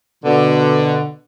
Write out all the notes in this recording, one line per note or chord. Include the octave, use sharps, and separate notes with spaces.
B2 D3